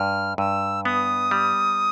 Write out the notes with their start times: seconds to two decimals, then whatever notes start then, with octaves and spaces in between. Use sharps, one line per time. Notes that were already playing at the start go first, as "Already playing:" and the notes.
Already playing: G2 F6
0.38 G2 E6
0.85 B3 D#6
1.31 G3